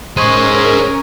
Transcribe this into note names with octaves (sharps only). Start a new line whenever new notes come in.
G#3 C#4 G#4 A#4 C5 C#6 G#6 D#7